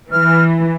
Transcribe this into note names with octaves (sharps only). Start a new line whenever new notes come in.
E3 F6